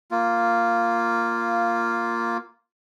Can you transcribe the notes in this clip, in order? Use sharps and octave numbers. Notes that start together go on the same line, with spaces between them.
A#3 F4